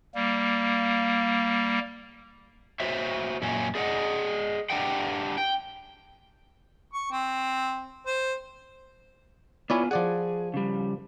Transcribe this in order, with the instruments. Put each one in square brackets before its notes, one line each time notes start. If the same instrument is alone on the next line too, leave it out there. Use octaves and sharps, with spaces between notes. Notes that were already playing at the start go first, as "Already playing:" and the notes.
[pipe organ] G3 A#3
[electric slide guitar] F#4 C5 C#5 E5
F#2 A#2 C#4
G#4 D5 D#5 F#5
D4 G4 A#4 D5 F#5 G5
G5
[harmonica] C#6
C4
C5
[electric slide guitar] B3 F4 G#5 [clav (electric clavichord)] E4 C#5 D5
[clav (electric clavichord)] F3 D5 F#5 [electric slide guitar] G#4
[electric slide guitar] C#3 G3